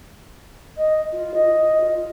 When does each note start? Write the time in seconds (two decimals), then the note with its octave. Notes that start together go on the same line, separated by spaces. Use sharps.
0.77 D#5
1.12 F4
1.34 D#5
1.80 F4